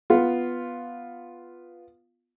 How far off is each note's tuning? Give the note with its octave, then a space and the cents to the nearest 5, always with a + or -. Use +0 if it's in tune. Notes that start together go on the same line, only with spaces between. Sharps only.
B3 +0 F4 +0